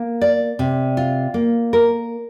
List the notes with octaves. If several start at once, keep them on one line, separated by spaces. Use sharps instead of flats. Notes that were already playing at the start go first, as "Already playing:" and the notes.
Already playing: A#3
D5
C3
F4
A#3
A#4